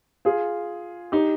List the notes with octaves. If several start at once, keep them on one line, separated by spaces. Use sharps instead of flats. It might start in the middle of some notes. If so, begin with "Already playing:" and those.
F4 G#4
D#4 G4